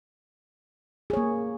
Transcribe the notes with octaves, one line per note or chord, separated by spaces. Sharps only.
A#3 G#4 C#5